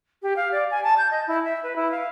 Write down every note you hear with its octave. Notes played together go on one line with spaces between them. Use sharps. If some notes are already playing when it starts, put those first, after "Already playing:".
G4
F5
D5
G#5
A5
G6
D#5
E4
E5
B4
E4
F5